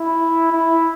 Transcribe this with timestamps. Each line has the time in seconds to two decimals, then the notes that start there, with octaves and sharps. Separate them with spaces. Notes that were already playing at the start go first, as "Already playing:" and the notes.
Already playing: E4
0.52 E4